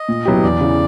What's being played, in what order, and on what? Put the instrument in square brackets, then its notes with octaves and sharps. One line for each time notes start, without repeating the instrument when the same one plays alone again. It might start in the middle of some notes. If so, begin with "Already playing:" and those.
Already playing: [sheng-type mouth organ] D#5
[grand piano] A#2
F#3 B3 E4 G4
[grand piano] E2 [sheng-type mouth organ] D5
[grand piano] C#3 E3